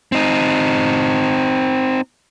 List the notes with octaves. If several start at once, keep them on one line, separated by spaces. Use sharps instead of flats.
C4 D#4